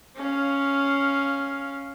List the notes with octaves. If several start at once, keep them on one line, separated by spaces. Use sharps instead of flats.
C#4 F5